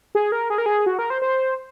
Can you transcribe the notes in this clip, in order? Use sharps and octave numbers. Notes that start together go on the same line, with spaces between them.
G#4
A#4
G#4
A#4
G#4
F#4
A#4
C5
C5